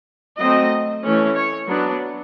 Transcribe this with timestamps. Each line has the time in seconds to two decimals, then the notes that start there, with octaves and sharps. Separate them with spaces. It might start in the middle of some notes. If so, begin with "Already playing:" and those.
0.39 F#3 A3 C4 D#5
1.04 E3 A3 C#4
1.36 C#5
1.69 F#3 B3 D4